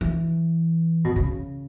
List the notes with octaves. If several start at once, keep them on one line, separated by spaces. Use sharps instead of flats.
E3
B2
C#3